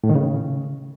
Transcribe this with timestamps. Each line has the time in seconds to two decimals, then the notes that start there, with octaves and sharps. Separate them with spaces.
0.04 A2
0.09 D#3
0.15 C#3